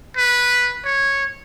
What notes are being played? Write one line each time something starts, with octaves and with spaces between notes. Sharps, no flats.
B4
C#5